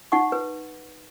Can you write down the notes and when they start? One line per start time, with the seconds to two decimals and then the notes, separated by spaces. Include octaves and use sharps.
0.12 D#4 F#5 C#6
0.32 B4